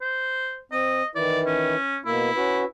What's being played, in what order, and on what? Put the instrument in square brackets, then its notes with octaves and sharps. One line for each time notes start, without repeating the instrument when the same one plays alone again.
[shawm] C5
[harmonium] C4 [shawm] D#5
[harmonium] D#3 E3 E4 [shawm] D5
[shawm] C#4
[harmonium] B2 A#3 [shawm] E4
[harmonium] C#4 F#4 B4